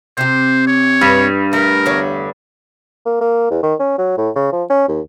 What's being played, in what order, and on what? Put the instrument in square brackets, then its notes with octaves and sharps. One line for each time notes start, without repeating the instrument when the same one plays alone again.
[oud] C3 G4 [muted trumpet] C5
[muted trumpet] C#5
[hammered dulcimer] G2
[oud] A3 [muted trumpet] A#4
[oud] E2 D3 C#5
[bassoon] A#3
A#3
E2
D#3
C#4
F#3
A2
C#3
F3
C#4
D#2